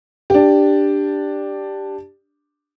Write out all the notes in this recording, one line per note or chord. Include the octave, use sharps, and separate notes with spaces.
D4 G4